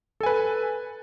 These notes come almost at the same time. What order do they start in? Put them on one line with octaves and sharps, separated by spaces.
A4 G#5 B4